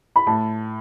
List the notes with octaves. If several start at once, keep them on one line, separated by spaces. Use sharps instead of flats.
B5
A2 A5